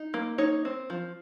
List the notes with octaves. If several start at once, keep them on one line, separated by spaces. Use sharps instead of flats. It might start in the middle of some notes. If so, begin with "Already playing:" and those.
Already playing: D#4
A#3
D#4 C#5
C4
F3